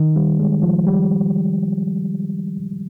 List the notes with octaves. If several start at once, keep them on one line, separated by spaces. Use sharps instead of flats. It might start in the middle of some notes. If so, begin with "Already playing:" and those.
Already playing: D#3
G3
G#3
F3
G3